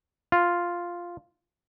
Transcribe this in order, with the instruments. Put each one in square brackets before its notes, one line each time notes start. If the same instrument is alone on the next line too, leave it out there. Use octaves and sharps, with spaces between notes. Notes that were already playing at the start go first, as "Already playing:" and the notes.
[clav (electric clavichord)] F4